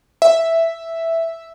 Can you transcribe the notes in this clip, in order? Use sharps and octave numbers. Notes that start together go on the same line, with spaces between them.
E5